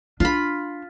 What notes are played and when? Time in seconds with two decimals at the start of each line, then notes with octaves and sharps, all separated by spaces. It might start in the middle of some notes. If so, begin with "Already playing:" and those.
0.20 D4 F4 B5